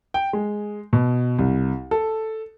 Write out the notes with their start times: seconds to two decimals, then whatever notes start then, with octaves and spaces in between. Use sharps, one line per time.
0.14 G5
0.33 G#3
0.93 B2
1.39 C2
1.91 A4